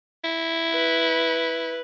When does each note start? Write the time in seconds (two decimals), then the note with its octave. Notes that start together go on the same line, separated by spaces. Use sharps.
0.24 E4
0.73 B4